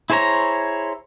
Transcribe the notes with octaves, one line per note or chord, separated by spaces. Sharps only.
E4 G#4 C5 C#5 A#5